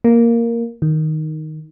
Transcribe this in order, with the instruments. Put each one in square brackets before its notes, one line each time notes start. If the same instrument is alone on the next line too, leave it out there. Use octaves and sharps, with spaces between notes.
[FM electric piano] A#3
D#3